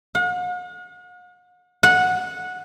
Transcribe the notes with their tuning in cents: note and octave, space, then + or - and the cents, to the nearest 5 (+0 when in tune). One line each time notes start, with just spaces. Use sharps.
F#5 -45
F#5 -15